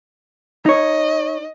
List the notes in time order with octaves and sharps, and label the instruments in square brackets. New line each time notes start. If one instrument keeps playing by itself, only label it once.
[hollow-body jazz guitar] D#4 C#5 [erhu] D#5